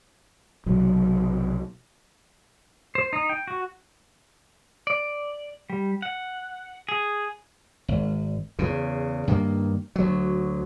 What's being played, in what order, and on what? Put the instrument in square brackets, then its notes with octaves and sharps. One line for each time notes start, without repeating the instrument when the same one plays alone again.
[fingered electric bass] B1 C3 F#3
[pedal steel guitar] C5
D#4
G5
F#4
D5
G3
F#5
G#4
[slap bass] G#1
E2 C#3
G2 D#3 A#3
D2 F#3